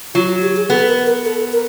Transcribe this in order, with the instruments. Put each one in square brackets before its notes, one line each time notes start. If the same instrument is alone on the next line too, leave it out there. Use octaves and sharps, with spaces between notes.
[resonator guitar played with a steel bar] F#3 [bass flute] F4
[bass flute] F#4
G4
G#4
[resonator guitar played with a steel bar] B3 [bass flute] A4
[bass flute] A#4
A#4
A4
A#4